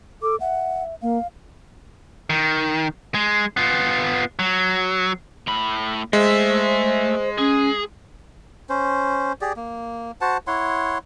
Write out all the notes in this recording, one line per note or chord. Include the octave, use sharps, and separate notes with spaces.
A4 D6
E5 F#5
A#3 F5
D#3
G#3
B3 F4
F#3
A2 B5
G#3 A3 C5 E5
C#4 G#4
C#4 C5
G4 G#4 D5
A#3
F#4 C5 F#5 A5
E4 C#5 F#5 C6